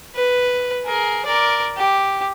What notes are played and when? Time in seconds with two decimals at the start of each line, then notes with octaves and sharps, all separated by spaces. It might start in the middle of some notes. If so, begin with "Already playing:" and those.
0.15 B4
0.86 G#4 A#4
1.26 A#4 D5
1.77 G4